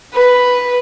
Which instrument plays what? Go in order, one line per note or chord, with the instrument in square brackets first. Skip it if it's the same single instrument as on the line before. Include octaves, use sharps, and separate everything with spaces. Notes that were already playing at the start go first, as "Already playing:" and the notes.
[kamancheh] B4